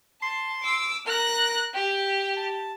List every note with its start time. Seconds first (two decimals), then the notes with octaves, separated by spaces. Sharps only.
0.22 A5 C6
0.62 D6 E6
1.07 A#4 F#6 A#6
1.74 G4 G5
2.36 A5